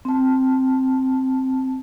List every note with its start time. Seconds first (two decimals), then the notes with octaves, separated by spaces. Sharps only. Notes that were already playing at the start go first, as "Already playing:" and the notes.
0.05 C4 A5